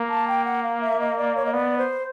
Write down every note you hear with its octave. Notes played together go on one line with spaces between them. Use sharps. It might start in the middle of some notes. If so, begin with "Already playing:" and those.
Already playing: A#3
A5
G5
F#5
F5
E5
D#5
D5
C#5
D#5
B3 D5
C5